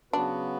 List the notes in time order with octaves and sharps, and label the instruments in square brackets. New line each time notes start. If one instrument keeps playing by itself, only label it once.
[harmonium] C#3 F#3 B3 F#4 B4 [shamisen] D4